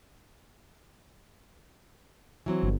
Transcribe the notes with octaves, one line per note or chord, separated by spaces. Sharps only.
E3 F#3 C4
G1